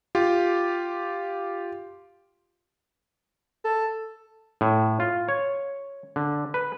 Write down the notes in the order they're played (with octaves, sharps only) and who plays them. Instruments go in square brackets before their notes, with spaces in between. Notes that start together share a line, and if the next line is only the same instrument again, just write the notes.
[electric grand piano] F4 G4
[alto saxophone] A4
[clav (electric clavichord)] A2
F4
C#5
D3
B4